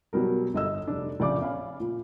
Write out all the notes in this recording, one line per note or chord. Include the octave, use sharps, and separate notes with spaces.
B2 F#3 G3 A#4
G1 D#5 E6
F1 D4
A#1 C#3 D5 D6
C#4 F5 B5
A#2